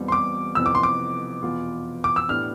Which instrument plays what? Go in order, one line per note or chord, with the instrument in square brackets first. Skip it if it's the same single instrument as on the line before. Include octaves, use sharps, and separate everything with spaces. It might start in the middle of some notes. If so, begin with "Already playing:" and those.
Already playing: [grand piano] E1 E2 B2 G3 C4
[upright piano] C6
D6
[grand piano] F1 F2 E3 B3 [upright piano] E6
[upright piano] D6
C6
D6
[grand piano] E2 B2 B3 F4
[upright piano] D6
E6
[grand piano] A2 E3 B3 D4 G4 [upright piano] F6